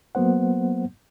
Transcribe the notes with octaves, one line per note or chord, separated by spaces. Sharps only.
F#3 A#3 B3 C5 F#5